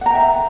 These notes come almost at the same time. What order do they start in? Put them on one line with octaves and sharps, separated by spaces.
F#5 A#5 G5 E5